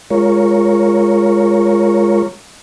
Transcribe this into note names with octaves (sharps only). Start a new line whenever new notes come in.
G#3 F4 A#4 C#5